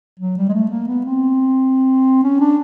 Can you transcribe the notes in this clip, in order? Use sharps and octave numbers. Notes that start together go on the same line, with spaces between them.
F#3
G3
G#3
A3
A#3
B3
C4
C#4
D4